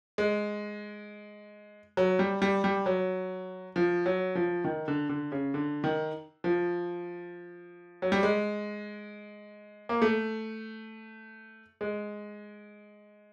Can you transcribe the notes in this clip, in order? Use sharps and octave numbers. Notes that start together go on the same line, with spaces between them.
G#3
F#3
G3
G3
G3
F#3
F3
F#3
F3
D#3
D3
D3
C#3
D3
D#3
F3
F#3
G3
G#3
A#3
A3
G#3